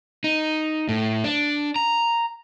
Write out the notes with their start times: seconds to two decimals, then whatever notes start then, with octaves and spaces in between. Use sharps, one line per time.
0.24 D#4
0.89 A2
1.24 D4
1.76 A#5